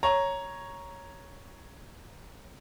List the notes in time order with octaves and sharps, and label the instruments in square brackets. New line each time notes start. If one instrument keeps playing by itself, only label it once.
[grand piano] C#5 A#5